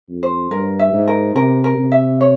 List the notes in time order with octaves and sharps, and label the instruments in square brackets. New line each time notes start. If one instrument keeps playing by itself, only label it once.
[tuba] F2
[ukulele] C5
[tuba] G2 [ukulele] A#4
[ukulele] E5
[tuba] G#2
[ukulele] A#4
[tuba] C3 [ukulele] A#4
[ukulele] A#4
[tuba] C3
[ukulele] E5
C#5